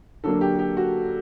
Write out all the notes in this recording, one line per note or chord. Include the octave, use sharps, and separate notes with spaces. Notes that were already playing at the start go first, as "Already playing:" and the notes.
D3 F#3 A#3 D4 A4
G4
G4
F#4